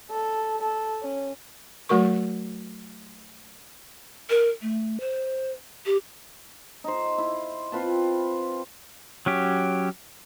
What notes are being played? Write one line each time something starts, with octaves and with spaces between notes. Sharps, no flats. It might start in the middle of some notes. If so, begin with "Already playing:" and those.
A4
A4
C#4
F#3 A3 F#4 A#4 C#6
A#4
A3
C5
G4
D#4 C5
E4
C4 F4 B4 A5
F#3 C#4 G4